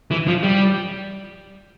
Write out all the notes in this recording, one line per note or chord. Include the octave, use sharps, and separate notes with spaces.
E3
F3
G3